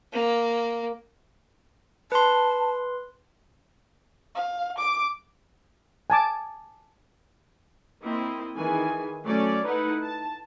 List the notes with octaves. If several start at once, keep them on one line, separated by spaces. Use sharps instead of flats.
A#3
B4 A5 C6
F5
D6
G#5 A5 D6
A#3 C4 E4 D#5
D#3 E3 G#4 G#5
F#3 A3 C#4 D5
A3 D#4 E4 B4 F#5
A5